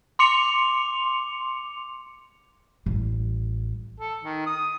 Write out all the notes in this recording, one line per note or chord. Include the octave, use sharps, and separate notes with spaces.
C6 D6 C#7 F7
A1 G3
A4
D#3
D#6